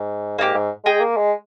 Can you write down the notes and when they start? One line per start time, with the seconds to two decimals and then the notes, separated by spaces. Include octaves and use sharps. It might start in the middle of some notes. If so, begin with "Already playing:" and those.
Already playing: G#2
0.38 G#2 A#3 D#4 G4
0.54 G#2
0.85 G#3 G#4 D#5 G5
1.00 A#3
1.17 G#3